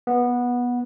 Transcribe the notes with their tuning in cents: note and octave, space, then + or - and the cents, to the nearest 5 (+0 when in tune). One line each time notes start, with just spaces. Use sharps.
B3 -15